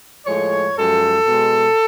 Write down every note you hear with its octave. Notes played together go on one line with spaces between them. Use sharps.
A2 F3 G#3 C#5
F#2 F3 G#3 A4
B2 G#3